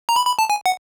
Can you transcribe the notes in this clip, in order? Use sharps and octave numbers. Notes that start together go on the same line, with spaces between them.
A#5
B5
B5
A5
G#5
F#5